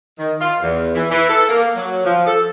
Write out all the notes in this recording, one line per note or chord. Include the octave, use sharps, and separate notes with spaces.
D#3
F4
E2
E3
E3
A4
A#3
F#3
F3
A4